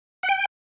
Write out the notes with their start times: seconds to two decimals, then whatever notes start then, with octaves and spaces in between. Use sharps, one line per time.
0.23 F#5
0.29 G5